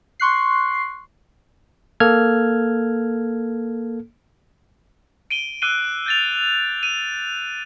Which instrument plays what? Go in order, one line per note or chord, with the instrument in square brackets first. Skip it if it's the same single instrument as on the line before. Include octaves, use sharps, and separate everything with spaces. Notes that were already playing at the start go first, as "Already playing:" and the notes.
[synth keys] C6 C#6 F#6 C7
[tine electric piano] A#3 A4 F6 G#6
[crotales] D7 D#7 G7
D6 E6 F#6 C7 D#7 G7
G6 A6 F7
D#7